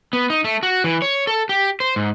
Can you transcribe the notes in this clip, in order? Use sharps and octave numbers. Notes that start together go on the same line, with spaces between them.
B3
D#4
A3
F#4
E3
C#5
A4
G4
C5
G#2